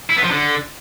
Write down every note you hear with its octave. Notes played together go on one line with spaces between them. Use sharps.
E4
B3
F3
D3